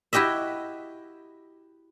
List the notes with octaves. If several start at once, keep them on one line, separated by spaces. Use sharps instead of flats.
E4 F#4 G4 D#5 E5